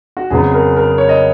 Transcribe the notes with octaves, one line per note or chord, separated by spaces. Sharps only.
F#4
F2 C#3 F#3 B3 G#4
A#4
A#4
C#5
D#5